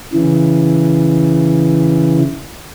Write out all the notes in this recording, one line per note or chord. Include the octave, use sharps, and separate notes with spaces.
C#3 E3